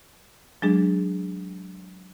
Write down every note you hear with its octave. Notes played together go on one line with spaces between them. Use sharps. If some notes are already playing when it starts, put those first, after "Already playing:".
F#3 G#3 D4 G#4